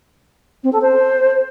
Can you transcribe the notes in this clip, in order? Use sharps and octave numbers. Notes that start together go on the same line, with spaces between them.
C4
A4
C5